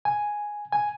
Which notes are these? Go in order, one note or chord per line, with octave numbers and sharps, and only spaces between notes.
G#5
G#5